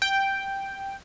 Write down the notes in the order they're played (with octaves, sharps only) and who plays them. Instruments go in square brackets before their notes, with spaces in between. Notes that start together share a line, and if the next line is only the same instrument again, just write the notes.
[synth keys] G5